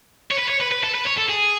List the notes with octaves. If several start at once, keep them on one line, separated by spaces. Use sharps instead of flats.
C#5
B4
C#5
B4
B4
A4
B4
C#5
A4
G#4